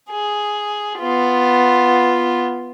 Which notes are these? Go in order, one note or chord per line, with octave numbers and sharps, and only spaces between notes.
G#4
B3 F4